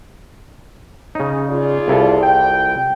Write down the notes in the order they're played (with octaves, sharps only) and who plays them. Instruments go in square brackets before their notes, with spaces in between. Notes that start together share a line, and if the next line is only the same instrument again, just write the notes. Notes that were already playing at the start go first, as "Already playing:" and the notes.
[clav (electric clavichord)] C#3 D#4 [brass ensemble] C#4
[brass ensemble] F4 G#4 D5
[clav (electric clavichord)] C2 E4 A4
[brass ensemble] G5